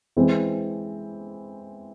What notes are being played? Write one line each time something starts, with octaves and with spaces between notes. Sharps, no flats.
E3 G#3 C4